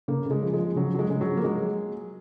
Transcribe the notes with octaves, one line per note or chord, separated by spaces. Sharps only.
C#3 A#3
C#3 G#3
F3
G#3
F3
C#3 F#3
C#3 F#3
G#3
C#3 G#3
F#3
F3
A#3
F#3 G#3